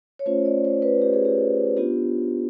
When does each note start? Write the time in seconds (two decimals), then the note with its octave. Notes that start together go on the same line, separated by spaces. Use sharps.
0.19 C#5
0.26 A3 C#4 F4 C5
0.45 D5
0.65 C5
0.82 B4
1.02 G4
1.13 G#4
1.25 G4
1.77 B3 D4 F4 G4